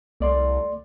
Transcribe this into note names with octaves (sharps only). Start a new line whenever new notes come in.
C2 A3 D5 C6